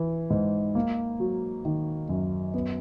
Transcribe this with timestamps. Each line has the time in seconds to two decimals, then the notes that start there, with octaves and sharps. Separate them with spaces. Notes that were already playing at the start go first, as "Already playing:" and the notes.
Already playing: E3
0.30 G#2
0.75 A#3
1.20 F#3
1.65 D#3
2.09 F#2
2.54 B3